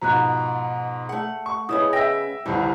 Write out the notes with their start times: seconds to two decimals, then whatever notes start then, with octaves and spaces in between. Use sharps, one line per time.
0.02 G#2 B2 F3 A#5 F#6
1.09 A3 F#5
1.46 C#6
1.69 C#3 G#3 B3 E4 D#6
1.93 E5 G5 A#6
2.46 G1 C2 E3 F3 G3 F4